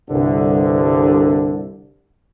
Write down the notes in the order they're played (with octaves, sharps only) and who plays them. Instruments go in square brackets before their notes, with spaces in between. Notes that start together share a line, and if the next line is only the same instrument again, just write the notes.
[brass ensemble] C2 G2 D3